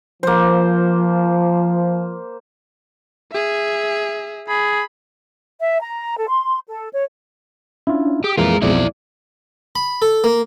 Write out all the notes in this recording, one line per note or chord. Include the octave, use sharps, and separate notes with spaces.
F3 A#3 C5
G#4 E5
G#4 B5
E5
A#5
A4
C6
A4
C#5
C#4 D4 E4 F4
G4 G#4 D#6
F2 A#2 E3 G#3 F4 G#4 A#4
B1 F2 F3 E4 D5
B5
A4
A#3